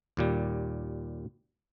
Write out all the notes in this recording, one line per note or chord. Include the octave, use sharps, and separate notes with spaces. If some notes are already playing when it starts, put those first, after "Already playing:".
D#2 A#2 G3